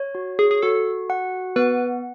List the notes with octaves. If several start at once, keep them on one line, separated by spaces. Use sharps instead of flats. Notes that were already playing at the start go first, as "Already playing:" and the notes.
Already playing: C#5
F#4
G#4
G#4
F#4 A4
F#5
B3 B4